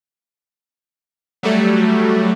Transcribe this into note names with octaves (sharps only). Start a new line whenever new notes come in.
F#3 G3 A3